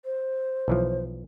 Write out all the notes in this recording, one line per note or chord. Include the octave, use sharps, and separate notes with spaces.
C5
B1 E3 F3